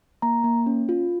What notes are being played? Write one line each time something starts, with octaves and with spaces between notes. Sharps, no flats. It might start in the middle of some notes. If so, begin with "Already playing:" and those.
A#3 A#5
A#3
C#4
F4